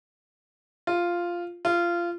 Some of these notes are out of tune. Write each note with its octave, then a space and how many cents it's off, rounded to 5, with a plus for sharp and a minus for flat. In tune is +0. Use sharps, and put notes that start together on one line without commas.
F4 -5
F4 -20